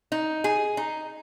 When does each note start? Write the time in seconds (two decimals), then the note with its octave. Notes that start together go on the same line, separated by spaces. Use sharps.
0.12 D#4
0.44 G#4
0.77 D#4